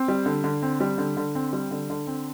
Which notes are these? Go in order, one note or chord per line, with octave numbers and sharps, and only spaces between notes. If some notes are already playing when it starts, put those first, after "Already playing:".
Already playing: C4
G3
D3
D3
C4
G3
D3
D3
C4
G3
D3
D3
C4